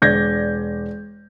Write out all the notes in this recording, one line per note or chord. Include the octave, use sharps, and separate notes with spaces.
E1 D5 G6 G#6 A#6